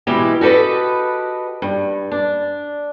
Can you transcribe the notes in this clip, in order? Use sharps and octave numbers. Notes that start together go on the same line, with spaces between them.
B2 E3 G#3 E4 G4
F#4 G4 A4 B4 D#5
G2
D4